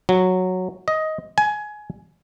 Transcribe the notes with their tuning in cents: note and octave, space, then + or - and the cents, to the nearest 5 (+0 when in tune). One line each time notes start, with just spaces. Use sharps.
F#3 -5
D#5 +15
G#5 +20